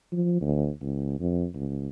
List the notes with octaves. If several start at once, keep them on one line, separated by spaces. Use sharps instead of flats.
F3
D2
C#2
F2
C#2